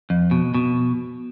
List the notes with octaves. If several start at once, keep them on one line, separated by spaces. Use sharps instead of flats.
F2
B2
B2